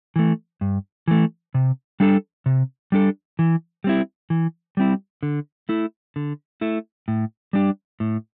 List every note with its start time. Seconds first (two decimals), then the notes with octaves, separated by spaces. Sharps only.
0.16 E3 A3
0.61 G2
1.08 E3 A3
1.55 C3
2.00 G3 D4 A4
2.46 C3
2.92 G3 D4 A4
3.39 E3
3.84 G3 C4 E4
4.30 E3
4.77 G3 C4 E4
5.23 D3
5.69 A3 E4
6.16 D3
6.61 A3 E4
7.08 A2
7.53 G3 D4 G4
8.00 A2